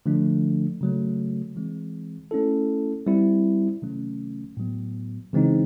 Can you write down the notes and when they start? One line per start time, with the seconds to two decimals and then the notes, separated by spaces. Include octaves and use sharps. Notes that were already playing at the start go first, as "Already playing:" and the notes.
0.06 D3 F3 A3 D4
0.81 C#3 F#3 A3
1.56 E3 G#3 C4
2.31 A3 C#4 E4 A4
3.07 G3 C4 E4
3.82 C3 D#3 F#3 A3 C#4
4.57 A2 F#3 B3
5.33 C#3 E3 G#3 C4 D#4